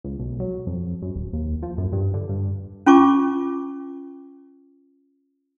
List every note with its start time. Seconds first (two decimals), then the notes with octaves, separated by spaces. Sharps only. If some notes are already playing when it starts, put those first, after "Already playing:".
0.04 C#2
0.19 B1
0.40 F#3
0.67 F2
1.02 F#2
1.15 D1
1.33 D#2
1.62 F3
1.78 F#2
1.92 G2
2.14 D3
2.29 G2
2.86 C#4 F4 A5 C#6 D6